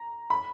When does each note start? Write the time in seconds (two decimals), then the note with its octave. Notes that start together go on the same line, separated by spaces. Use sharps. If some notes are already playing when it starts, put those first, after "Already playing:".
Already playing: A#5
0.30 B5